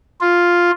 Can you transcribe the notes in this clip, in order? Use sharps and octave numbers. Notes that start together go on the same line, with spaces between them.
F4